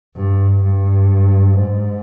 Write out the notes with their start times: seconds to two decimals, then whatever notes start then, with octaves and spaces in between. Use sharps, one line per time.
0.16 G2
0.64 G2
1.58 G#2